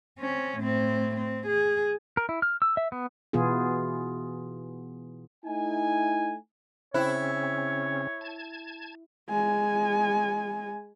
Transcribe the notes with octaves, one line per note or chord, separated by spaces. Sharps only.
C4 C#4
A2 C4
C4
G#4
A#4
E4
F6
E6
E5
B3
B2 E3 B3 F4 G#4
A3 D#4 E4 G#5
C#3 C4 C#4 E4 C5 C#5 G5
A5 G#6
G#3 G#5